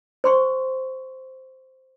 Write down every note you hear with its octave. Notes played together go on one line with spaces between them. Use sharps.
C5 C6 C#6